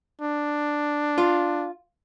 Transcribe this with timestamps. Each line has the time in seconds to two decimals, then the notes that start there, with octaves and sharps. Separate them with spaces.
0.21 D4
1.18 F4